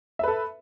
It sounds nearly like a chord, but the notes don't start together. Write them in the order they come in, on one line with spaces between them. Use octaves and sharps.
E5 B4 A4